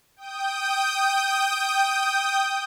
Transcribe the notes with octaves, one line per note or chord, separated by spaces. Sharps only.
G5 D#6 G6